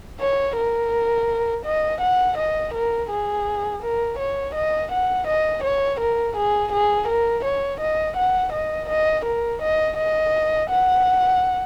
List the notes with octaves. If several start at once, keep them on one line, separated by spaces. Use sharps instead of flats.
C#5
A#4
D#5
F#5
D#5
A#4
G#4
A#4
C#5
D#5
F#5
D#5
C#5
A#4
G#4
G#4
A#4
C#5
D#5
F#5
D#5
D#5
A#4
D#5
D#5
F#5